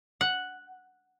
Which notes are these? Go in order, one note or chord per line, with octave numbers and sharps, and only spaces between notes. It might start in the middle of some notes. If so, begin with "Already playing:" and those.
F#5